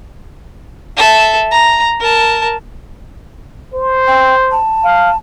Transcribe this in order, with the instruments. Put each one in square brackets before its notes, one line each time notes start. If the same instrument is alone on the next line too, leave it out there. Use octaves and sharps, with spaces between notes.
[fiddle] A4 E5
A#5
A#4 A5
[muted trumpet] C5
[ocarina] G5
A5
[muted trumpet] F5